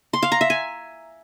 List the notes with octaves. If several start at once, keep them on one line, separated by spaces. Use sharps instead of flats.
C6
F5
A#5
E5
G#5